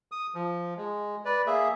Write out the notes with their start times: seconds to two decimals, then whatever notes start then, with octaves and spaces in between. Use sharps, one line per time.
0.12 D#6
0.34 F3
0.77 G#3
1.25 B4 D5
1.47 A#3 G#4 E5